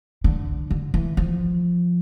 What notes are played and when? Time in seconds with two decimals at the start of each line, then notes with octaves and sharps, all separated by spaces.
0.24 D3
0.71 D3
0.94 E3
1.17 F3